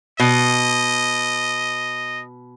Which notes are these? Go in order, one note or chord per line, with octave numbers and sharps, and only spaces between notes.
B2 D#5